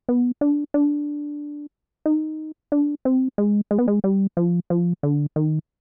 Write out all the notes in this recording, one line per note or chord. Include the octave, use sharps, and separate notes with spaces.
B3
D4
D4
D#4
D4
C4
G#3
G#3
B3
G#3
G3
F3
F3
D3
D#3